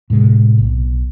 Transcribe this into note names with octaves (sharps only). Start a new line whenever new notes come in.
A2 C3 G#3
B1